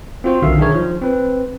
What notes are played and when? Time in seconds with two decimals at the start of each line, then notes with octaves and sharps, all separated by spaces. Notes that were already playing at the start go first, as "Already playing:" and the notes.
0.24 C4 F4 F#4 C5
0.42 B1 D3 D#3 E5 F5
0.58 D#3 D4 G#4 A#4 C#5
0.74 F3
1.02 C4 B4